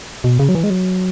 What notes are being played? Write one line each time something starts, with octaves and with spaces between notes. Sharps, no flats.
B2
C#3
F#3
E3
G#3
F#3